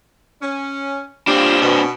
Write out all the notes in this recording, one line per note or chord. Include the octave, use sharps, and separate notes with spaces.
C#4
C4 D4 F4 G4
B2